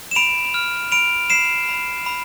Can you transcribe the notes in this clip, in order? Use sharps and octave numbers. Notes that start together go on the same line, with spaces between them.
E7
B5 D7 F7
F6
B5 D7 F7
B5 C7 E7
B5
B5